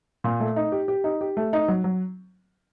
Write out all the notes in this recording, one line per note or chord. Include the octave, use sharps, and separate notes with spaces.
A#2
A3
D#4
G4
G4
D#4
G4
A3
D#4
F#3
F#3